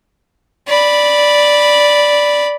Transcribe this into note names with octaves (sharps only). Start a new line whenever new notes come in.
D5 B5